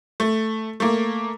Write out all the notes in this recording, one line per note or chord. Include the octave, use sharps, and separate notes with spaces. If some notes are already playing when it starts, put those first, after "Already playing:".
A3
A3 A#3